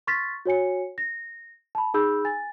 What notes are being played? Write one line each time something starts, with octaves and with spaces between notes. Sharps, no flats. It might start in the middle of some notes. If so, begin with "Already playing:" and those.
C6 C#6 F6 A6 B6
F#4 C#5 G#5 C#7
A#6
A5 B5
D#4 G#4 B5 E6 G6
G#5 A6